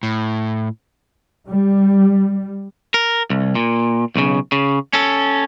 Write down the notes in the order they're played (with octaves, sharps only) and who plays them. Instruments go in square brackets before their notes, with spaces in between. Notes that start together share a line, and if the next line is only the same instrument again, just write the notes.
[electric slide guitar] A2
[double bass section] G3
[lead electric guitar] A#4
C2
A#2
B1 C#3
C#3
C#4 A4